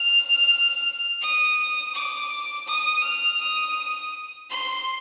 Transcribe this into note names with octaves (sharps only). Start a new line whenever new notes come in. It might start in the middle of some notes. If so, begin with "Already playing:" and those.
Already playing: F6
D#6
D6
D#6
F6
D#6
C6